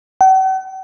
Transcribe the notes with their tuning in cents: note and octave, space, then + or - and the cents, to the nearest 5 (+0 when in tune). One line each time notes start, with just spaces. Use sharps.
F#5 +45